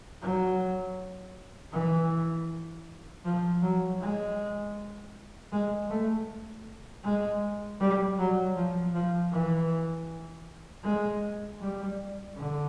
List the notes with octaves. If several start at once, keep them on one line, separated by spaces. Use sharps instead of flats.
F#3
E3
F3
F#3
G#3
G#3
A3
G#3
G3
F#3
F3
F3
E3
G#3
G3
D3